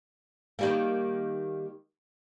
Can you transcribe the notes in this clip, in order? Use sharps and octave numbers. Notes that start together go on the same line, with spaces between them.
D#3 G3 A#3